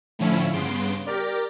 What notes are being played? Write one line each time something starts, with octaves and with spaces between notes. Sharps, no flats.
A2 D3 F3 C#4 E4
G2 C#3 B3 C6 D7
G4 A#4 D5